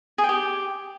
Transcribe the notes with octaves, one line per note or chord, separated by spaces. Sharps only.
G#4
G5
G4